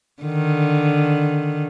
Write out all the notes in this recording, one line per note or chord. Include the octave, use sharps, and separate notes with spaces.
D3 D#3